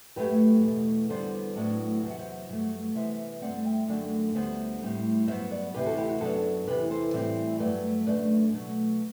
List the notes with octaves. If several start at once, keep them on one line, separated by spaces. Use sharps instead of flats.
F#2 F#3 A3 G4 B4
E2 B2 A3
E2 D3 G3 B3 D4 A4 C5
A2 F#3 B3 D4
E2 C3 F#3 E5
F#5
C5 E5
G2 F#3 A3
C3 E3 B3 C5 E5
G2 D3 A3 C4 D5 F#5
E5 G5
F#2 D3 F#3 A3 D4
D2 D3 G3 B3 C5 E5
A2 G3 C4
G2 F#3 B3 C5 E5
B4 D5
D2 C3 E3 G4 B4
F#4 A4
E4 G4
F#4
F#2 F#3 B3 D4 F#4 A4
E2 C3 E3 G4 B4
A4 C5
A2 E3 G3 C4
G2 F#3 A3 B4 D5
F#2 D3 A3 D4 B4 D5
B2 F#3 A3